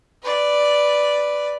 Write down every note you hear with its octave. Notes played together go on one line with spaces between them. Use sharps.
B4 D5